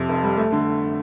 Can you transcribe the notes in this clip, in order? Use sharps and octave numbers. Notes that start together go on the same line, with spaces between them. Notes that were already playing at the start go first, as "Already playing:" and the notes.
Already playing: F2 C3
F1
G3
A3
D3